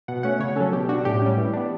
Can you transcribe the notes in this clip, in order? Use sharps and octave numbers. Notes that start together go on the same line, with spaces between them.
B2 F#5
A3 C#4 F#5
C#3 C#5
F#3 C#4 A4
B2 G4
G3 D4 F#4
A2 G4
G3 C#4
E3
B3 D4